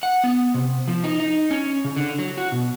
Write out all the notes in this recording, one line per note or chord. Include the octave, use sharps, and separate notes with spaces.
F#5
B3
C3
F3
D#4
D#4
C#4
C#3
D3
F#3
F#4
B2